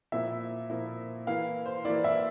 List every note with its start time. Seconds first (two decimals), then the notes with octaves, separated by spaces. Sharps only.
0.12 A#2 F3 A#3 E4 E5
0.70 A#2 F3 A#3 E4
1.27 E3 A#3 E4 F5
1.66 C5
1.85 E3 A#3 E4 D5
2.04 E5